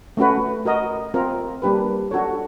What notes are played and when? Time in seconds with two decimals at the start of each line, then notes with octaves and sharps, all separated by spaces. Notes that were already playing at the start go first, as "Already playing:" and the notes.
0.17 A3 C#4 F#4 B4
0.65 F#4 A#4 D#5
1.14 C4 F4 A#4
1.62 G3 A#3 D4 G4 B4
2.11 D4 F#4 A4 C#5